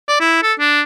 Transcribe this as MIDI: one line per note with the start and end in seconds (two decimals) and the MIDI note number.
0.08 0.16 74
0.21 0.39 64
0.43 0.54 69
0.60 0.82 62